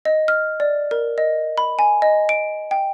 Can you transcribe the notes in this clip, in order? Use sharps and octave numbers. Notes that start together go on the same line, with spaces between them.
D#5
F6
D5
A#4
D#5
B5
G#5
D#5
D7
G5